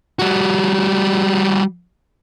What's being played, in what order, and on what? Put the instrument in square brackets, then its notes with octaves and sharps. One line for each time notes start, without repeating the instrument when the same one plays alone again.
[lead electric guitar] G3 F#4